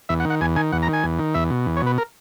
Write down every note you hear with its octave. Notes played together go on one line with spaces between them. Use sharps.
E2 E5
F#5
D#3
F#5
E2 G#5
D#3 G#5
E2 F#5
A#5
D#3
G#5
E2
D#3
E2 E5
B2
E2
C#5
B2 B4
A#4